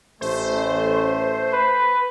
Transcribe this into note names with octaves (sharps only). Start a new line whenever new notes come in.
A1 A3 C5
B4